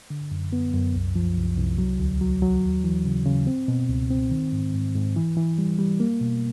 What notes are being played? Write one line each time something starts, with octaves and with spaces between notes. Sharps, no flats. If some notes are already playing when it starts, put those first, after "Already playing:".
D3
F#2
B3
F#2
C2
F3
C2
C2
F#3
D2
F#3
F#3
D#2
E3
C#3
C#3
C4
B2
C#2
C4
D#3
G#2
G#2
G#2
E3
E3
G3
G3
A#3
B2